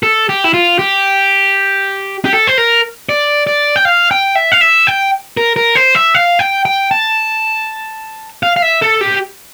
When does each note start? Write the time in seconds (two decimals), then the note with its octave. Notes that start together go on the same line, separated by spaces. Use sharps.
0.03 A4
0.29 G4
0.44 E4
0.54 F4
0.79 G4
2.25 G4
2.33 A4
2.47 C5
2.58 A#4
3.09 D5
3.47 D5
3.76 G5
3.85 F5
4.11 G5
4.35 E5
4.52 F5
4.61 E5
4.87 G5
5.37 A#4
5.56 A#4
5.75 C5
5.95 E5
6.15 F5
6.39 G5
6.65 G5
6.91 A5
8.43 F5
8.56 F5
8.62 E5
8.82 A4
9.01 G4